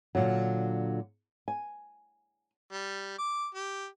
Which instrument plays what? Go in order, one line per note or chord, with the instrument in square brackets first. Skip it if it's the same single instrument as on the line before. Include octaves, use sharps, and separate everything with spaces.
[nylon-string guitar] A#2 D3 F#3
G#5
[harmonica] G3
D6
G4